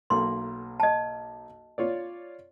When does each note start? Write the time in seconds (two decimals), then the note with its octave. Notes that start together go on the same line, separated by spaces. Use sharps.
0.10 B1 A#3 A4 C6
0.80 D#5 A5
1.78 F4 C#5 D5